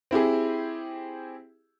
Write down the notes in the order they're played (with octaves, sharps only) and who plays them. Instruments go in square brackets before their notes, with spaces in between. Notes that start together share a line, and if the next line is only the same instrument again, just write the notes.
[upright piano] C4 E4 G4 G#4